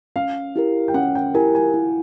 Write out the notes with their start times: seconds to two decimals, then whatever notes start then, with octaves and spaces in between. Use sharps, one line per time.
0.16 C#4 F5
0.56 E4 G4 A#4
0.88 G5
0.94 C#4 F#5
1.15 G5
1.34 E4 G4 A#4 G#5
1.55 G#5
1.74 E4